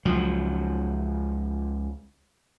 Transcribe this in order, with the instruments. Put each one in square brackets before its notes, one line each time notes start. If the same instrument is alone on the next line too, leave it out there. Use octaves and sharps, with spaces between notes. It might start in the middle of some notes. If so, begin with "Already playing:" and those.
[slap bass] C#2 F3 F#3